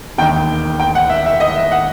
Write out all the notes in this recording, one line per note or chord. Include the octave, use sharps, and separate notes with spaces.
E1 D#2 D#3 G5
G5
F#5
E5
E5
D#5
E5
F#5